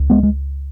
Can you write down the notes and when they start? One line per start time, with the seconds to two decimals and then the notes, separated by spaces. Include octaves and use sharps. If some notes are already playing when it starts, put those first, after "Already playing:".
Already playing: C#2
0.10 G#3 B3
0.23 G#3